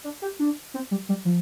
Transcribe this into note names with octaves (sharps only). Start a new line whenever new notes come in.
D4
G4
D4
C4
G3
G3
F3